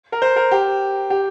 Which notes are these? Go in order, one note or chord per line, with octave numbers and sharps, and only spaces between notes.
A#4
C5
A#4
G4
G4